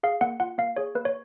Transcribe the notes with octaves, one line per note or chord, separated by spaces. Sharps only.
G#4 F5
A#3 F#5
F4 F#5
A#3 F5
G#4 C#5
A#3 B4
C#5